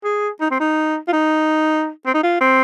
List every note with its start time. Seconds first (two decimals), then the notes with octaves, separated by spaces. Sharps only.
0.04 G#4
0.41 D#4
0.51 C4
0.60 D#4
1.08 F4
1.13 D#4
2.06 C4
2.14 D#4
2.23 F4
2.41 C4